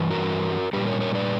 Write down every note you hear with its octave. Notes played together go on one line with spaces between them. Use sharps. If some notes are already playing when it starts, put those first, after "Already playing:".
Already playing: G2 E3
F#4 A#4
A#2 G3 G4 B4
A#4 C#5
A#4 C#5
B4 D5